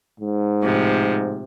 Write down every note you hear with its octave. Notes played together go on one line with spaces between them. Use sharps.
G#2
A2 C3 F3